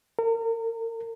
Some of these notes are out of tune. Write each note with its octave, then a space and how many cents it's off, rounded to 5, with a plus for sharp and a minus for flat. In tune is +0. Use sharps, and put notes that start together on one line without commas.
A#4 -35